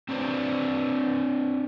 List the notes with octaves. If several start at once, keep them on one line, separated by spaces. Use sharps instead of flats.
C4 D4 B4 C5 D5